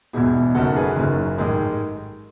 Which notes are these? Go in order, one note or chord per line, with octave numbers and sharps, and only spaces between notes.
E1 E2 B2 E4 G#4
F#1 F#2 D#3 F#4 A4
G#4 B4
F#1 F#2 D#3
A1 G#2 D#3 G#3